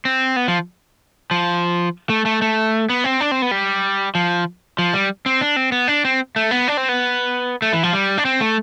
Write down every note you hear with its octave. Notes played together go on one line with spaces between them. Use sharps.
C4
B3
F3
F3
A3
A3
A3
B3
C4
D4
C4
B3
G3
F3
F3
G3
C4
D4
C4
B3
D4
C4
A3
B3
D4
C4
B3
A3
E3
F3
G3
D4
C4
A3